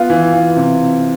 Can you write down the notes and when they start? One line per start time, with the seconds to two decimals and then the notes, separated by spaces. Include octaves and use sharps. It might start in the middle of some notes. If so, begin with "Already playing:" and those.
Already playing: B3 F4 F5
0.10 E3
0.33 E3
0.56 C3